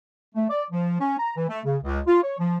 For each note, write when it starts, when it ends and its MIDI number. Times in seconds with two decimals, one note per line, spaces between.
0.35 0.45 57
0.50 0.64 74
0.71 0.98 53
1.00 1.16 61
1.18 1.32 82
1.36 1.48 52
1.48 1.60 57
1.65 1.77 49
1.83 2.00 37
2.07 2.22 65
2.23 2.35 73
2.39 2.58 53